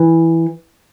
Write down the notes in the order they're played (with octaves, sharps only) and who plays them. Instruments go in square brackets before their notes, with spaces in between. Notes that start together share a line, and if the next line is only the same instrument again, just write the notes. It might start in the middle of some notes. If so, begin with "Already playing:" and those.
Already playing: [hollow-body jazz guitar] E3